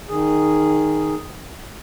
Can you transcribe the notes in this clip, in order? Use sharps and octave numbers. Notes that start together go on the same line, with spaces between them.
D#3 G#4